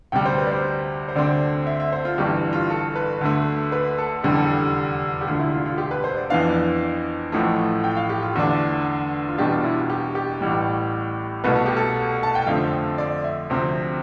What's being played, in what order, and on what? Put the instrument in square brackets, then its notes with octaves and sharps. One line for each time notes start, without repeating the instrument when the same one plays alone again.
[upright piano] D2 C3 G3 G5
C5
B4
D5
C5
C5
D2 D3 A3 C4 D5
E5
E5
C5
F4
G1 G2 E3 G4
F4
A4
B4
D2 D3 A3
B4
A4
F1 E2 D3 G3 G4
A4
G4
G4
E1 D2 D3 F4
E4
F4
F4
G4
B4
C5
D5
F2 E3 B3 D4 F5
A1 A2 F3 A3
G5
F5
G4
F4
E2 D3 A3 D4
F4
E2 B2 G3 D4 G4
F4
E4
F4
G4
G4
A1 A2 G3
C2 B2 A3 B4
A4
G4
A4
A5
G5
F2 D3 F3 A3 C4 F5
D5
E5
D2 C3 F3 C4